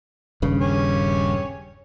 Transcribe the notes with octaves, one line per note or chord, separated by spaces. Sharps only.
D#1 G2 C#3
G4 C#5 G#5